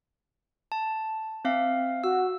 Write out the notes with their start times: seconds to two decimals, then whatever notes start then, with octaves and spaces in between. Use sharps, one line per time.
0.72 A5
1.45 C4 E5 F5
2.04 F#4 E6